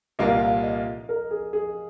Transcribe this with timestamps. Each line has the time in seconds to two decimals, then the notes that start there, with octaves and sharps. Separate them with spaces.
0.19 C2 A#2 A#3 F4 A#4 D#5
0.41 F5
0.63 D#5
1.09 A#4
1.31 G#4
1.53 G#4